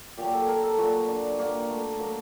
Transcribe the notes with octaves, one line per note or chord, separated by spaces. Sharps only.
A#2 F#3 G4
A4
A#4
A4
A#2 F#3 F#4
D4
G2 F#3 A#3
A3
F#3 A#3